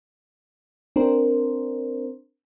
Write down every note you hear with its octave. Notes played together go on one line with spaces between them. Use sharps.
C4 D4 A#4 C5